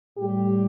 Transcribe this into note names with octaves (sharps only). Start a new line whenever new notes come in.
A2 G3 G4